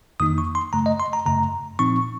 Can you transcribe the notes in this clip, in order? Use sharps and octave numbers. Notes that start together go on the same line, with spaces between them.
F2 D#3 A#3 D#4 D#6
C#6
C6
F#2 C#3 A3 A#5
D#5
C6
A#5
F#2 C#3 A3 A#5
A#2 F3 C4 D#4 C#6